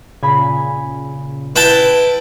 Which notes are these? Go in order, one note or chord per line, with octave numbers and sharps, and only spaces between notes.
A#2 C#3 G#5 B5
E4 B4 G5 A5